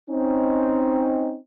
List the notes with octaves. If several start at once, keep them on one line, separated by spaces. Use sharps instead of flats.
C4 C#4 D#4